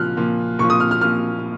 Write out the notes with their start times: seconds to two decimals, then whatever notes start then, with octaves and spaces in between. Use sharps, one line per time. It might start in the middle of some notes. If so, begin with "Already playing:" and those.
Already playing: A#2 F3 F6 F#6
0.17 A#2 F3
0.59 A#2 C#6
0.62 F3
0.70 D#6
0.80 F6
0.91 F6
1.01 A#2 F3 F6